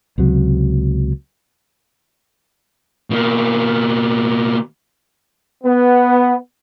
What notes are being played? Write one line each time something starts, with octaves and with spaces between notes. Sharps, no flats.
C#2 C3 F#3
B2 A#3
B3